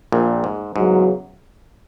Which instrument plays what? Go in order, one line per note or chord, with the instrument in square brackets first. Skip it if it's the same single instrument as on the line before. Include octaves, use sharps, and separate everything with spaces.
[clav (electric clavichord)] A#1 A#2
G#2
[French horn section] E2 C#3 F#3 [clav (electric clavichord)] G#2